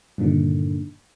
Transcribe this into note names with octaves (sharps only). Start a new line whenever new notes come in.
G2 A#2 D3 D#3